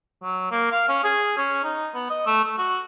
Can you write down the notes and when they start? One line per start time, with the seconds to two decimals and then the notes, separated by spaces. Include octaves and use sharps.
0.23 F#3
0.51 A#3
0.72 F5
0.88 C#4
1.04 G#4
1.37 C#4
1.64 D#4
1.95 B3
2.10 D#5
2.26 A3
2.44 A3
2.58 F#4